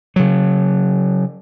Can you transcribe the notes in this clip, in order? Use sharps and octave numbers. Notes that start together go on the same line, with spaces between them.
C#3 F#3